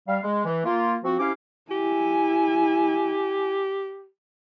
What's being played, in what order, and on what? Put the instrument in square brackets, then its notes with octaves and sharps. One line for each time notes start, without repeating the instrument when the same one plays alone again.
[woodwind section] G3 F5
G#3
E3
A#3 F4
F3 C4 F#4
C3 C#4 E4 G4 F5 D6
[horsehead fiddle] E4 G#5 [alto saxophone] G4